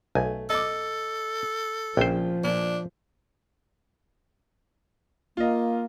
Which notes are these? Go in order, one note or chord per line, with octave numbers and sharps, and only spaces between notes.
B1 A3 G#5
A4 D#5 D6
A#1 A#2 C#3 F3 C5 G5
A#2 D4
A#3 F4 D#5